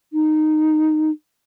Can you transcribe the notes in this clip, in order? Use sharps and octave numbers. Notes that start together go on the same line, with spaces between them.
D#4